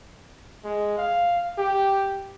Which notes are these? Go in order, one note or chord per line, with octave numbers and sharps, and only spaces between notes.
G#3
F5
G4